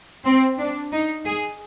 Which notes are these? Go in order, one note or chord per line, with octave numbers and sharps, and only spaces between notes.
C4
D4
D#4
G#4